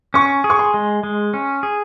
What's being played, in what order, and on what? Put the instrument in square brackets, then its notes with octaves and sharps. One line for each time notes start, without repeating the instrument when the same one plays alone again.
[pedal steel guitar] C#4 [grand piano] C#6
[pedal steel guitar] G#4
[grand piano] C#6
C6
[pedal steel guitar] G#3
G#3
C#4
G#4